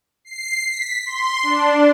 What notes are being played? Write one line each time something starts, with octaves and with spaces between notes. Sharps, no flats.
C7
B6
C6
D4